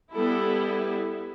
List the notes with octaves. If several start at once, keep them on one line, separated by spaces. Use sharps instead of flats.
G3 B3 E4 A4